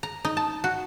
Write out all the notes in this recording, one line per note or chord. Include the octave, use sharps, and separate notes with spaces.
A#5
D#4
A5
F#4